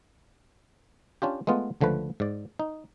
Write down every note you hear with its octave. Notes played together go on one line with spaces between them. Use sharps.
C#4 D4 F4 G4
G#3 A3 B3 F4
C#2 D3 F3 A3 B4
G#2 D5
D#4